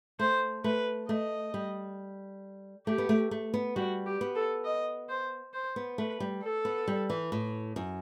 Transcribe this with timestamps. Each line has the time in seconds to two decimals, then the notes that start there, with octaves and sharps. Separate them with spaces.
0.19 A3 C5
0.64 A3 B4
1.09 A3 D#5
1.54 G3
2.87 A3 G4
2.98 B3
3.09 A3
3.31 A3
3.54 B3
3.76 G3 F#4
4.06 G4
4.21 B3
4.35 A4
4.65 D#5
5.09 C5
5.54 C5
5.76 B3
5.98 A3 B4
6.20 G3
6.43 A4
6.65 B3
6.88 G3
7.10 E3
7.32 A2
7.76 F#2